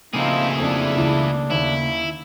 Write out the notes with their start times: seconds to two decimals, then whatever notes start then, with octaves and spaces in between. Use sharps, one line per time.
0.14 C#3 F3 A3 A#3 C4 D#4 E4 G#4
0.59 F2 D4
0.97 C#2 E3 A5
1.50 D#2 E4